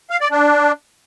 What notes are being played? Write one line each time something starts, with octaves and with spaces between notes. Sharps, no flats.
F5
D5
D4